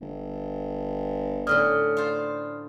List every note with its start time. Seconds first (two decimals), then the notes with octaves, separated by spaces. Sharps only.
0.01 G1
1.47 A2 D3 C#4 D5 D#6 F6
1.97 F4 C5